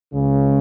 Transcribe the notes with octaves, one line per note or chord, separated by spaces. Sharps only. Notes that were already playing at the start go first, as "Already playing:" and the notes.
C#2 C#3